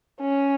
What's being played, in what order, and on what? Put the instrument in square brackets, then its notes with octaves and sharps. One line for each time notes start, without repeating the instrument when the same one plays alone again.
[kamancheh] C#4